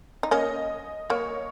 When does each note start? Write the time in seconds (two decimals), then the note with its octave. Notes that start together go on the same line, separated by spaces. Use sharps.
0.23 D#4
0.31 A#3 C#4 D#5
1.10 A#3 C#5